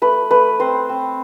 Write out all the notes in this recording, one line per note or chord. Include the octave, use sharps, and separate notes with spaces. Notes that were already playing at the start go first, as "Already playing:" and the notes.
A3 B4
A3 B4
C4 C5
C4